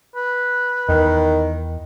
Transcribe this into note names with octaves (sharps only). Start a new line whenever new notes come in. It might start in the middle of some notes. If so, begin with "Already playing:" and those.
B4
E2 D#3